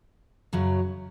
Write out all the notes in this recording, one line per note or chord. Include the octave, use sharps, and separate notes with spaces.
F#2 C#3 F#3